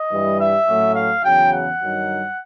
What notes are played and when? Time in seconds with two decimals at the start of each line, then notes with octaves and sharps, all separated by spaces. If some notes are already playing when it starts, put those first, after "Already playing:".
Already playing: D#5
0.11 G2 E3 G3
0.39 E5
0.67 A2 F#3 A3 C#4
0.95 F5
1.23 E2 C#3 F#3 G5
1.51 F#5
1.80 G2 D#3 F#3